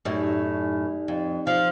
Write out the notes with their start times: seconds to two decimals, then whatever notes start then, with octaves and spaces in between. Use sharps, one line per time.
0.05 F#2 A2 D#4 G4 D5
1.08 F2
1.47 F3 F5